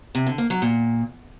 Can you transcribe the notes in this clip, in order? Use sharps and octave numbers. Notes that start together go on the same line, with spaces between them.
C3
D3
A#3
F#3
A#2